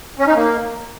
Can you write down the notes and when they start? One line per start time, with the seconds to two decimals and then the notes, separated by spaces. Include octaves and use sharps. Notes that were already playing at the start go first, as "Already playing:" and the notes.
0.19 C#4
0.27 D#4
0.35 A#3